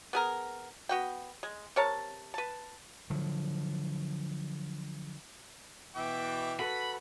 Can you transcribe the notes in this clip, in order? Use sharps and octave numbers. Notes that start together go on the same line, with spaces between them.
B3 G#4 A#4
B3 F#4 G5
G#3
C3 A#4 C#5 A5
B4 A5
D3 F3 F#3
B2 E3 E5 G5 D6
F#4 A4 B4 B5